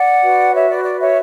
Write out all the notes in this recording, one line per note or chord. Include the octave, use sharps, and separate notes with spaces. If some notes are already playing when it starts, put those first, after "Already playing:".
Already playing: D5 F#5
F#4 B4
C#5 E5
D5
D5
C#5 E5